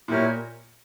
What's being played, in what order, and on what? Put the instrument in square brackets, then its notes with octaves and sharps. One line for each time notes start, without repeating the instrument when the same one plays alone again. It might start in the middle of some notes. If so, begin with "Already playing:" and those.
[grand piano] A#2 [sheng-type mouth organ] E4 G4 A#4 C#5